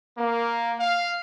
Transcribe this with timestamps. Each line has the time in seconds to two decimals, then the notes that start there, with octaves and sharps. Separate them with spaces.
0.17 A#3
0.80 F5